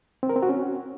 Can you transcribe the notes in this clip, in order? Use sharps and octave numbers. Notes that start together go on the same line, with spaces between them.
C4
A#4
C4
F#4
C#4